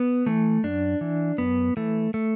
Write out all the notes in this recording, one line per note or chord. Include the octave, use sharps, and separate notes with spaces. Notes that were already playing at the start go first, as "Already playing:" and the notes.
Already playing: B3
E3 A3
F#2 D4
E3
F#2 B3
E3 A3
A3